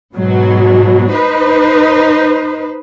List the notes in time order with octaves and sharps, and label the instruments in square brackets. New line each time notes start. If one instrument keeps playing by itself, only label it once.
[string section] G#2 B2 F#3
D#4 B4 C5